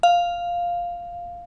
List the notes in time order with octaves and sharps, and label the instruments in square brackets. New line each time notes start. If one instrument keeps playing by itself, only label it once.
[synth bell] F5